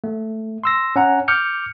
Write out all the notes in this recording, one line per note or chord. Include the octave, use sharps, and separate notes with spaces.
A3
C6 E6 A#6
C#4 F#5 A#5
D6 F6 G6 C#7